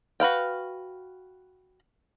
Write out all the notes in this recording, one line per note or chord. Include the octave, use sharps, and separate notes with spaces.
F#4 B4 F5 G5